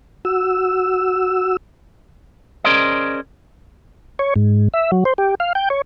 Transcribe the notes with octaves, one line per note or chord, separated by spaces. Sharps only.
F#4 E6
C#4 G#4 A#4 C5 D5 D#5
C#5
G#2
E5
F#3
C5
G4
F5
G5
C#5